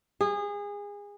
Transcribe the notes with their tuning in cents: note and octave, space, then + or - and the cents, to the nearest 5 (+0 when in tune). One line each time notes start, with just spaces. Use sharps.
G#4 -25